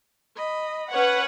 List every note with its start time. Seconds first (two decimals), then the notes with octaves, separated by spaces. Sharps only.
0.36 D#5 B5
0.91 C#4 B4 C#5 F#5